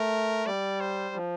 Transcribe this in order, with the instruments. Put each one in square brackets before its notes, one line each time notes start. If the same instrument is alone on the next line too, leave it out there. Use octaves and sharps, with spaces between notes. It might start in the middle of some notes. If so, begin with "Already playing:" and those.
Already playing: [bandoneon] A3 [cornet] A#4
[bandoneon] G3 [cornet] D5
[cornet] C5
[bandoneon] F3